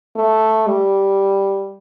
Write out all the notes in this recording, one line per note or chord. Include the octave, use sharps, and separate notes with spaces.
A3
G3